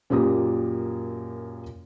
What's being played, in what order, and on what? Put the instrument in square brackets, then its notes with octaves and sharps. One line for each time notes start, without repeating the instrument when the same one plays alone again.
[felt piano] F#2 A#2 A#3 G4 D#6